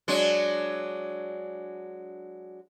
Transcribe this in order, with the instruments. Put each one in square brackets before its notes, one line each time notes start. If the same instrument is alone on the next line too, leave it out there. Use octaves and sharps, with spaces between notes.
[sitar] F#3 G#3 D4